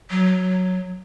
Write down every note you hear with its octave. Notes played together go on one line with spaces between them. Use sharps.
F#3